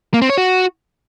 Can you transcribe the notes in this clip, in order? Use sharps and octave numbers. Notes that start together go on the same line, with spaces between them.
A#3
C4
C#5
F#4